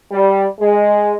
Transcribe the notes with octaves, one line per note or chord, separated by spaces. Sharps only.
G3
G#3